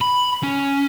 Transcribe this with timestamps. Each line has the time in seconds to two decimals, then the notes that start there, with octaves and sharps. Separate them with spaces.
0.01 B5
0.43 C#4